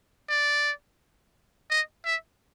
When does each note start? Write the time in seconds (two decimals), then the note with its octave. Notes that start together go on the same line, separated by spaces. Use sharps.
0.29 D5
1.70 D#5
2.05 E5